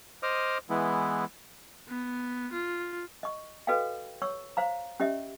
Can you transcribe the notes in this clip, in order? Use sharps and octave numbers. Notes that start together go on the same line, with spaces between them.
C5 D#5 D6 D#6 F6
E3 G#3 B3 E4
B3
F4
D#5 C#6
F#4 A4 B4 D#5 F5 G5
C#5 C#6 E6
C5 F5 A#5
C#4 G4 D#5 E5